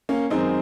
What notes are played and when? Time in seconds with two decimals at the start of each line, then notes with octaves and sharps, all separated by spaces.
0.09 A#3 C#4
0.30 F#2 D#3 G#3 C4 D#4